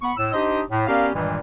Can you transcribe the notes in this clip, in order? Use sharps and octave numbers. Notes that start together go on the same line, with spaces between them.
B3 F#5 B5 C#6
A2 E6
D4 D#4 G4 C5 D#5
A2
B3 C#4 G4 A#4 D5 F5
G2 A#2 D#3 E3 G3 G#3